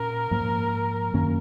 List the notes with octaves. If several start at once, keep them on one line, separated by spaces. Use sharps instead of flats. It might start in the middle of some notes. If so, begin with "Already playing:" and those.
Already playing: A#2 C#4 A#4
G#2 F3 A#3
F#2 D#3 A#3 C#4